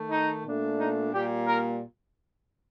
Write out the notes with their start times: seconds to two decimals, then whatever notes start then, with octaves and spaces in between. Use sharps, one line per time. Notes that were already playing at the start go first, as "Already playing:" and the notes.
Already playing: D#3 A3
0.12 D#4
0.45 A#2 A3 D4
0.80 D#4
1.13 A#2 G3 A#3 G4
1.47 A#4